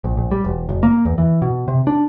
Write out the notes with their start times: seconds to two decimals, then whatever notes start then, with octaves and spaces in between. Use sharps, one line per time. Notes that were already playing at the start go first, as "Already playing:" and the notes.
0.04 A#1
0.17 A#1
0.31 G3
0.44 E1
0.69 F#1
0.83 A#3
1.05 E2
1.18 E3
1.42 B2
1.68 C3
1.87 D4